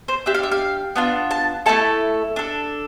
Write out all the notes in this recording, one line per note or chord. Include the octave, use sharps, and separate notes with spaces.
C5
D4 G4 E5
F5
E5
F5
B3 D4 F4
A5
A3 C4 E4 A4 A5
D4 A4